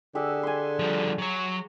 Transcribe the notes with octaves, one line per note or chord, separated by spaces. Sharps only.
D3 G4 G#4 E5
G#5 C6
F3 G3
F#3 C#5